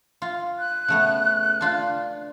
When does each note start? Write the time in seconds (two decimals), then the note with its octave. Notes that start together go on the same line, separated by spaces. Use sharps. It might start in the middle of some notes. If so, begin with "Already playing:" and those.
0.22 F4
0.59 F#6
0.88 C#3 A3 B3
1.61 D4 F4